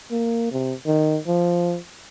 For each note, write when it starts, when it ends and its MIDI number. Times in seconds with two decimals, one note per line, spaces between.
0.11 0.49 58
0.52 0.74 48
0.87 1.19 51
1.27 1.78 53